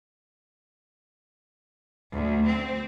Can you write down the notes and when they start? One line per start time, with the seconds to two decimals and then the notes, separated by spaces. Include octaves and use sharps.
2.14 D2
2.47 C4